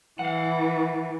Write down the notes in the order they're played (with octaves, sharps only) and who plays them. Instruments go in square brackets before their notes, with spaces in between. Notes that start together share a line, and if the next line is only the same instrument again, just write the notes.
[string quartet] E3 [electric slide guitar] F5 F#5